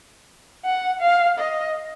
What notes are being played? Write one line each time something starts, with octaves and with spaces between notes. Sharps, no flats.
F#5
F5
D#5